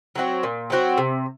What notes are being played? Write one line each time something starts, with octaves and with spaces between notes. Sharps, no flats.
F#3 C4 F#4
A#2
F#3 C4 F#4
C3